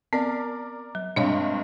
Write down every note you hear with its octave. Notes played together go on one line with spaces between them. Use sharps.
B3 C4 A#4 D5
F#3
G2 C3 G#3 D4 C#5 F5